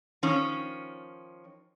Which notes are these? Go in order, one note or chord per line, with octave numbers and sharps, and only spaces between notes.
D#3 F3 C#4